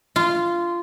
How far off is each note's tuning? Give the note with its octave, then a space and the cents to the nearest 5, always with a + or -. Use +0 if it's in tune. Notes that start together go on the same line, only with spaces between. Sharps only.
F4 -15